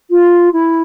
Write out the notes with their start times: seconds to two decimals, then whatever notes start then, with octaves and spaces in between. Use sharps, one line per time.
0.10 F4
0.53 E4